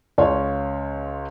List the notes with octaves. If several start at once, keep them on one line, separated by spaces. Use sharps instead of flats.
C#2 C#5 F5 C6